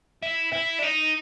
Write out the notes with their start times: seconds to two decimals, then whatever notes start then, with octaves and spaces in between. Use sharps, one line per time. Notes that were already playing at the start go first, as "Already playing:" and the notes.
0.23 E4
0.53 E4
0.79 D4
0.83 D#4